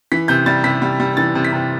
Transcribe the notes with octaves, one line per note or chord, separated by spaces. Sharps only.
E3 B6
C3 G6
G3 A6
C3 B6
G3
G3
E3 A6
C3
B6
C3